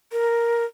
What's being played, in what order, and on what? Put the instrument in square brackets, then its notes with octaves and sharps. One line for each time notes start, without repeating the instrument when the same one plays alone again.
[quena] A#4